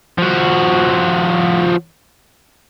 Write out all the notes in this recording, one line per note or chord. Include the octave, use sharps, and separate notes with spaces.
F3 F#4